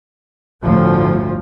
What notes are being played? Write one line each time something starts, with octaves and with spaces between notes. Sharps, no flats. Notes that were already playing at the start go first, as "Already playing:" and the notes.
G1 D2 A2 F3